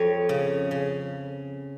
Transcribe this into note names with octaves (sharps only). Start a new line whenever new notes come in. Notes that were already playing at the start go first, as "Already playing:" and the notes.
Already playing: F2 C#5
C#3
C#3